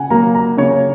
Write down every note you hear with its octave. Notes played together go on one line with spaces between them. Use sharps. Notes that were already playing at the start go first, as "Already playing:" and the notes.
Already playing: C#3 F#5 G#5
F#3 A#3 A#5
A#5
C#3 C#5